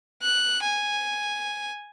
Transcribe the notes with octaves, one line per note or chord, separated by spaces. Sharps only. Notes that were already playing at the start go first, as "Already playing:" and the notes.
F#6
G#5